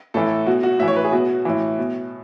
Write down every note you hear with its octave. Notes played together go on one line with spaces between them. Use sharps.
A2 E3 A4
B2 F#4
F#4
A2 E3 C#5 E5
B4
G#4
B2 F#4
A2 E3
B2